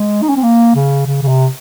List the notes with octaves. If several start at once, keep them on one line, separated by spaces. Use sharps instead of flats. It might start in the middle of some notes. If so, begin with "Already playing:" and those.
Already playing: G#3
D#4
C#4
C4
A#3
C#3
C#3
C#3
C3